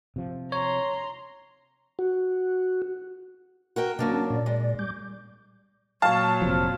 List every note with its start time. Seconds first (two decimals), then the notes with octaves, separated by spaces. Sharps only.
0.16 C3 F3
0.52 C#5 A#5 C6
1.99 F#4
3.76 F#4 A#4 G5
3.99 C3 F#3 A#3 D4
4.12 C#4 A5
4.30 A#2 D5
4.46 G#3
4.79 G3 D6 G6
6.02 A#2 F#3 C#5 F5 A5
6.42 F1 C3 F3